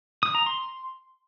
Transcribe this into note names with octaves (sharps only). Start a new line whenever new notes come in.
D#6
A#5
C6